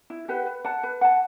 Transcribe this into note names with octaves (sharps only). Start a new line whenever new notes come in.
E4
G4 B4 F#5
B4
F#5 A5
B4
F#5 A5